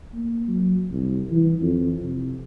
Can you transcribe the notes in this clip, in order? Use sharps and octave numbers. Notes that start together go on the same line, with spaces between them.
A#3
F#3
C2
E3
F2
C3